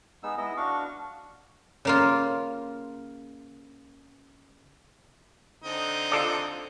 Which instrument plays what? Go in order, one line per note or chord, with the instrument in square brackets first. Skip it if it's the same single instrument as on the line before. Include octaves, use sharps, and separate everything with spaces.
[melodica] G#3 B3 D#4 E6
B3 E4 D#5
D4 F#4 F5 C#6
[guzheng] C#3 A#3 F4
[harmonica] D3 C4 D#4
[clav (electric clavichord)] F4 A4 D5